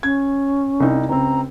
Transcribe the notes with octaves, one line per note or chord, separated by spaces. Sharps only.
C#4 G#6
C2 D#4
C#2 C4 A#5